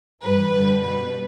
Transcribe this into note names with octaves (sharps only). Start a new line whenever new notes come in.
G2 E3 G3 B4
F#2 D3 G3
B2 G3 B4